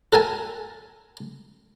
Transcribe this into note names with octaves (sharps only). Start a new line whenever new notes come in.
A4 A#4 G#5 A5